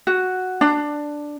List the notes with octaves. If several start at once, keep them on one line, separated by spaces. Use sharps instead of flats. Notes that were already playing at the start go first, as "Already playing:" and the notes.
F#4
D4